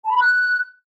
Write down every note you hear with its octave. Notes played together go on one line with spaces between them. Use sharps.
A5
B5
A#5
F#6